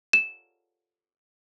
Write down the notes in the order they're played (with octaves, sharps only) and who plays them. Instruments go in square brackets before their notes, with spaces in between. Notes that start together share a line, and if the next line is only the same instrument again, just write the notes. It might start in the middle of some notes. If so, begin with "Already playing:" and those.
[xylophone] E7